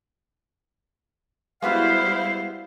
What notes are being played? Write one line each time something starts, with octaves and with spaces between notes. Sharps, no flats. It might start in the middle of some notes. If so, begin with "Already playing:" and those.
G3 G#3 B3 E4 F#4 C5 F5